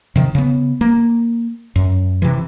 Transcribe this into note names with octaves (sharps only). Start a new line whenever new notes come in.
C3 D#3
C#3 B3
A#3
F#2
C3 E3